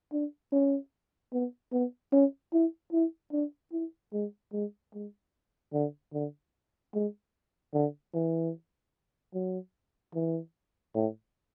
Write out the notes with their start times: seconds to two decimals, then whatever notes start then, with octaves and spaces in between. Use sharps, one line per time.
0.12 D4
0.52 C#4
1.33 B3
1.72 B3
2.12 C#4
2.53 E4
2.93 E4
3.32 D4
3.72 E4
4.13 G#3
4.53 G#3
4.94 G#3
5.73 D3
6.13 D3
6.94 G#3
7.73 D3
8.14 E3
9.34 F#3
10.14 E3
10.94 A2